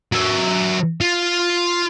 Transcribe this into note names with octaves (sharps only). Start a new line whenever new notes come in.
F#3 E5
F4